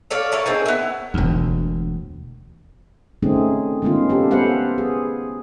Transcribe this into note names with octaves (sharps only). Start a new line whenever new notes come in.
A4 C#5 D5 F5
E4 A4 A#4 C#5
A#3 C4 D#4 G#4
B3 E4
E1 D2
D#3 A3 C4 C#4 D#4 G#4
D#3 G#3 B3 C#4 F4
C#4 G4 A4
B3 A4 B4 C5 F5 F#5
G#4